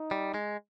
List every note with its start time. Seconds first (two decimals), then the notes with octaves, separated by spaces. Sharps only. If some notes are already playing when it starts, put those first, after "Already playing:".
Already playing: D#4
0.11 G3
0.34 G#3